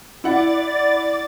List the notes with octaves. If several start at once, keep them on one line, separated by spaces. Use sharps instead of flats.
E4 D5 F#5 A6